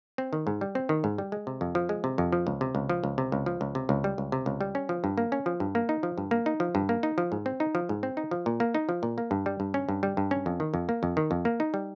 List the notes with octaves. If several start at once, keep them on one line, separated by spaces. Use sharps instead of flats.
C4
D#3
G#2
G3
C4
D#3
G#2
G3
G#3
C3
F2
F3
G#3
C3
F2
F3
C#2
C3
C#2
F3
C#2
C3
C#2
F3
C#2
C3
C#2
G3
C#2
C3
C#2
G3
C#4
F3
G2
A#3
C#4
F3
G2
A#3
D#4
F3
G2
A#3
D#4
F3
G2
A#3
D#4
F3
G#2
C4
D#4
F3
G#2
C4
D#4
F3
A#2
A#3
D#4
F3
A#2
A#3
G2
G3
G2
C#4
G2
G3
G2
C#4
F2
D#3
F2
A#3
F2
D#3
F2
A#3
D#4
G3